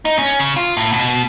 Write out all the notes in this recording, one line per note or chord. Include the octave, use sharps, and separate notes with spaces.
D#4
C#4
C#3
F4
A2
B2